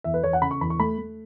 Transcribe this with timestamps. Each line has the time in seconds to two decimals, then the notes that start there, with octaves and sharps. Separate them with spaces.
0.04 E2 E5
0.14 B4
0.23 E2 C#5
0.33 F#5
0.42 C#3 B5
0.51 C#6
0.61 E2 B5
0.70 C#6
0.79 A3 B5
0.98 A3